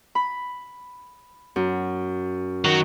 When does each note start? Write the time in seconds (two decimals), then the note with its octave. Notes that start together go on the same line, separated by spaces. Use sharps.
0.15 B5
1.56 F#2
2.65 D#3 F#3